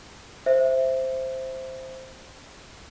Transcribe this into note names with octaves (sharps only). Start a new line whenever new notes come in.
C5 E5